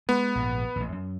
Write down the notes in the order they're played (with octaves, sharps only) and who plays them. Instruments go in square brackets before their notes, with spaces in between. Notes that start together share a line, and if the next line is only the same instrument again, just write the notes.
[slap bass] G#3 [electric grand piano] B3
[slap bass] A#1 G#2
A1 E2
F#2